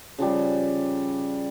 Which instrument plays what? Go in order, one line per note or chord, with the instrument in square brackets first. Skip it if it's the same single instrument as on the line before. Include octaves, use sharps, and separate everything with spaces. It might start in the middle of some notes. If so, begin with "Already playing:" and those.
[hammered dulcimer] C#3 F3 G3